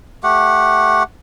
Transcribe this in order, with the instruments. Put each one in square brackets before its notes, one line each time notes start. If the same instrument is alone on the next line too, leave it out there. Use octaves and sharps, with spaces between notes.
[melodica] A3 G4 F#5